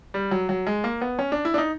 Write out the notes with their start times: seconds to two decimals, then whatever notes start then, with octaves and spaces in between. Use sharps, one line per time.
0.14 G3
0.31 F#3
0.49 F#3
0.67 G#3
0.84 A#3
1.01 B3
1.19 C#4
1.32 D4
1.45 E4
1.54 D4
1.58 D#4